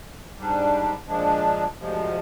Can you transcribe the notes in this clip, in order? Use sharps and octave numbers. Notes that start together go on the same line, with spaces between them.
G#2 G3 D4
A#2 F3 G#3 D4
D2 C3 F3 G#3